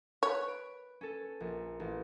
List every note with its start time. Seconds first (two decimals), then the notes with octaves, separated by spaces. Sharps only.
0.23 B4 C#5
0.48 D7
1.01 C#4 A4
1.40 A#1
1.80 A1